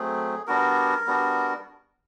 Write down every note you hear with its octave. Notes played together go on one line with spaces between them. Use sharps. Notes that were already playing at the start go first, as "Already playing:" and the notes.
Already playing: F#3 A3 C4 G#4
G3 B3 D4 F#4 A#4
G3 B3 D4 F#4